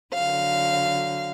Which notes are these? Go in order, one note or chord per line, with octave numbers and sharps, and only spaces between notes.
D3 F#3 F5